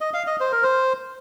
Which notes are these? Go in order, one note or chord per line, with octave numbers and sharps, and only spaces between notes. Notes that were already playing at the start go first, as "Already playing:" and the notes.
D#5
F5
D#5
C5
A#4
C5